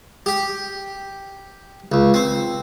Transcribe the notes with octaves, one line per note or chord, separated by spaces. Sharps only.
G4
C#2
C4